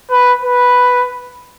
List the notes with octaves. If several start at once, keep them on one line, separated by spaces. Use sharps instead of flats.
B4
B4